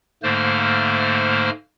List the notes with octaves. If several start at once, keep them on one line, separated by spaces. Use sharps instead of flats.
G#2 D3 A3 A#3 C5 F6